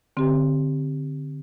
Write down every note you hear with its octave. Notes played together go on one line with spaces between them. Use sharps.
D3 C4 G4